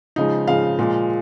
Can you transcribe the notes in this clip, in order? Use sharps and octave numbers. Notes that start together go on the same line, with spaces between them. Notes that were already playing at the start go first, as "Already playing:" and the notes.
C#3 F3 G#3 D#4
C#3 F3 G#3 F5
A#2 F3 G#3